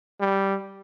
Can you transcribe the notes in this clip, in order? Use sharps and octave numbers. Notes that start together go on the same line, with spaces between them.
G3